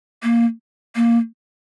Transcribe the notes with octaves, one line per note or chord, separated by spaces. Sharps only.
A#3
A#3